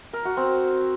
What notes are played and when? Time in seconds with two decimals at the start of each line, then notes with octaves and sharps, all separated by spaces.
0.13 A#4
0.25 F#4
0.37 C4